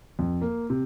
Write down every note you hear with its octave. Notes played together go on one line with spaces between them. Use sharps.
F2
A#3
C3